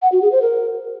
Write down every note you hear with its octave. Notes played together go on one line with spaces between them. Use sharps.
F#5
F#4
G#4
C5
A#4